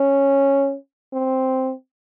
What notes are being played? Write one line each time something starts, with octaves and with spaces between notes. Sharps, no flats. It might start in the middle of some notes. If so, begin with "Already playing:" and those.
Already playing: C#4
C4